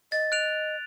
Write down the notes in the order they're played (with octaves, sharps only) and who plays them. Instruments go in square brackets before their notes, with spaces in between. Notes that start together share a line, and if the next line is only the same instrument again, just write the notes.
[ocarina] D#5 [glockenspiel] A6
[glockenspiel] F#6 D7 F7